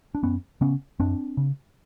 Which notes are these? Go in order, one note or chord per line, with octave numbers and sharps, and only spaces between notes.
D4
F#2 B3 C#4
C#3 B3 C#4
F#2 C4 D4
C#3